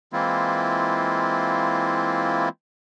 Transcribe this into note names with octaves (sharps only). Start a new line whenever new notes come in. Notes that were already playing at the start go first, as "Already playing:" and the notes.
E3 G#3 A#3 C4 E4 F4